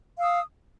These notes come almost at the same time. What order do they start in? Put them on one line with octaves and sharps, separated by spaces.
F5 E6 D#6